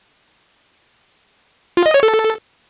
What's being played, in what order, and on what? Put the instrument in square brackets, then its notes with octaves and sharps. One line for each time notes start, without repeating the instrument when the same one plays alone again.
[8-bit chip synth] F4
D#5
C#5
A4